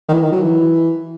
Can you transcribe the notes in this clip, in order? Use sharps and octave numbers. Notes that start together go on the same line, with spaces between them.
D#3
E3
D#3
F#3
E3